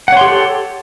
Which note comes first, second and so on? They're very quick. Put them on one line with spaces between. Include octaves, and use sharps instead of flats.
F#5 C#5 C6 G4 A4